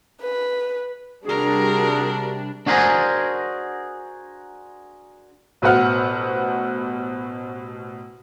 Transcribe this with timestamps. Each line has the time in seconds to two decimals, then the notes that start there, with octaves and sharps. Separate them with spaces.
0.21 B4
1.26 C3 G3 D4 F#4 G#4 A#4
2.66 D4 F#4 G#4 A#4 C5 G#5
5.62 A1 B2 B4 C5 F#5 F6